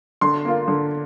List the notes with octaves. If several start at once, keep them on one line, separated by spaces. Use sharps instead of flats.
D3 C6
A#3 F4
D3